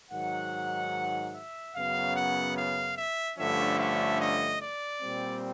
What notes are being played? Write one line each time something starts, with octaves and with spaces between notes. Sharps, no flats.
G#2 D#3 F#3 F#5
E5
F#2 C#3 F#3 B3 F5
F#5
F5
E5
G2 D3 F3 A3 C#4 E5
E5
D#5
D5
A#2 G3 C4